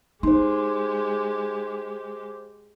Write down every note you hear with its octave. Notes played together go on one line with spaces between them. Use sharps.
G#3 D#4 G4 C5 C6